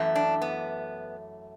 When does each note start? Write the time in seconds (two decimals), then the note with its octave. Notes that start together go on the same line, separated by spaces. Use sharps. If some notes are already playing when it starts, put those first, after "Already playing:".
Already playing: F#2 E3 A3
0.15 D4
0.42 B3